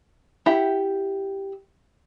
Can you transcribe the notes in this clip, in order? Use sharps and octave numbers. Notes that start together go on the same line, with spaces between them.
E4 G4 E5 F#5